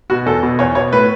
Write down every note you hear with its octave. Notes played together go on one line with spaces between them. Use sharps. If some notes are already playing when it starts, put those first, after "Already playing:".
B2 F#4
E2 A4
B2
E2 C#5
B2 C#5
A2 B4